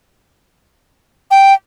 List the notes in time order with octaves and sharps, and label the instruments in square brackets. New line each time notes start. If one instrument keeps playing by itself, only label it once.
[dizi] G5